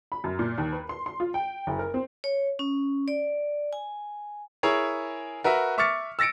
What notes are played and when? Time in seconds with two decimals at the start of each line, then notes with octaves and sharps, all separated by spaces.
0.12 B5
0.24 F#2
0.39 A#2
0.58 D#2
0.73 B4
0.89 C6
1.06 C6
1.20 F4
1.34 G5
1.67 F#1
1.79 A#4
1.94 C4
2.24 C#5
2.59 C#4
3.08 D5
3.73 G#5
4.63 E4 G#4 A#4 C#5
5.44 F#4 A#4 B4 E5
5.78 E5 C#6 D6 F6 A6 C#7
6.19 E6 A6 A#6 C#7 D7